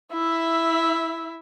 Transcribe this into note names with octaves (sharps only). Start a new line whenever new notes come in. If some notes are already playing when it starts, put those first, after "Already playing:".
E4 E5